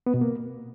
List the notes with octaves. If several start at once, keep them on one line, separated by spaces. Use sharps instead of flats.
B3
B2
A#3